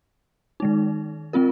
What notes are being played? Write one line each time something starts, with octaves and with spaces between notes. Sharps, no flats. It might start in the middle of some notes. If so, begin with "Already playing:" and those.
D#3 G#3 D#4
G#3 C4 F4 A#4